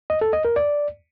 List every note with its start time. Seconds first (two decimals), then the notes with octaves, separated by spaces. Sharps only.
0.10 D#5
0.21 A4
0.33 D#5
0.45 A#4
0.56 D5